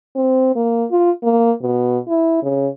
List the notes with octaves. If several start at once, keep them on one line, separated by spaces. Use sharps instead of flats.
C4
A#3
F4
A#3
B2
E4
C#3